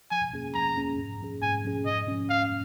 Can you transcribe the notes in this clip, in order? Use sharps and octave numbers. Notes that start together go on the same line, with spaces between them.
F3 G#5
A#3 C#4 G#4
F3 A#5
A#3 C#4 G#4
G#2
F3 C#4 G#4
G#2 G#5
F3 C#4 G#4
G#2 D#5
F3 C#4
G#2 F5